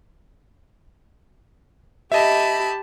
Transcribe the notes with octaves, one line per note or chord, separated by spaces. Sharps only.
G4 D#5 E5 A5 B5